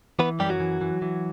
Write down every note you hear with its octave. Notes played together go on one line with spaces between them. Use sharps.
E3 B3 B4
F#2 G3 G4
F#3 F#4
E3
E3
E3